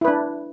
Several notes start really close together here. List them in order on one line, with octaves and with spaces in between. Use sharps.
E4 B4 D4